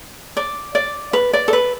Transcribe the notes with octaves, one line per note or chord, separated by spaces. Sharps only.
D5
D5
B4
D5
A4
B4